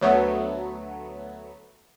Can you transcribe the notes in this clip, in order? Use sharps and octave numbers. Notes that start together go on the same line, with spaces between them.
D2 F#3 A3 B3